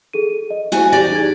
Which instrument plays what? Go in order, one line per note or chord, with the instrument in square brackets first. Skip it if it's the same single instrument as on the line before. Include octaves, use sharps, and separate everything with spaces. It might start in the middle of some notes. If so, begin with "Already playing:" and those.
[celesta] G#4 A4 D#7
D#5
[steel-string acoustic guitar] A3 F#4 G#5 [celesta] E4 C5
[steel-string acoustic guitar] E2 G4 D5 [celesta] A#6
[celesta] D#4 G#4 G#6